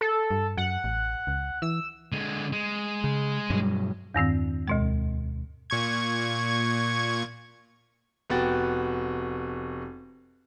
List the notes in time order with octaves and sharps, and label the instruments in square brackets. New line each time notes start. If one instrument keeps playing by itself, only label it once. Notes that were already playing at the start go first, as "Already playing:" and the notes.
[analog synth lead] A4
[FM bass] G2
[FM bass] F#2 [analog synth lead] F#5
[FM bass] A1
C#2
[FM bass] E3 [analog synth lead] E6
[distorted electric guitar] D3 G#3
G#3
[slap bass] C#3
G2 B2 F#3
[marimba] E2 G2 D#3 C4
D2 B2 G#3
[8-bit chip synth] A#2 C#6 G#6
[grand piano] F1 B3 F#4 G5 A6